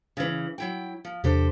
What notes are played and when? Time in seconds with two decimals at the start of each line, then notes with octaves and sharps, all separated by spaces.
0.17 C#3 E3
0.58 F#3 E4 G5
1.05 F3
1.24 E2 C3 D4 G4 A4 C5